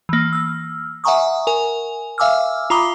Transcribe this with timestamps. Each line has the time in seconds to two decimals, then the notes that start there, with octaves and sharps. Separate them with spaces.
0.09 E3 A#3
0.33 E6 F6
1.04 E5 F#5 G#5 A#5 C#6 D#6
1.47 A#4 G#5
2.18 E5 F5 G#5 D6 E6 F6
2.70 F4 A#5 B5 D6 D#6 G7